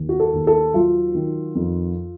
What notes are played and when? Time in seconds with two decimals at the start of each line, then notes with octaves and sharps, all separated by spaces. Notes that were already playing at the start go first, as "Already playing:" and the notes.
Already playing: D#2
0.09 F#4
0.20 A4
0.34 D#2
0.47 A4
0.74 F#3 F4
1.15 D#3
1.55 F2